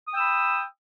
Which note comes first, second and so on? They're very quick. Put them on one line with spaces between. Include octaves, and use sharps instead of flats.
D#6 G5 E6 B5